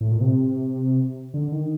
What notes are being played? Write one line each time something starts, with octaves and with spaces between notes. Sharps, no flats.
A2
A#2
C3
D3
D#3